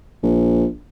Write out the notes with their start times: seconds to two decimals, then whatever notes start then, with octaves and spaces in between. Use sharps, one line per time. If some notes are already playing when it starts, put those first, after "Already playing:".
0.23 A#1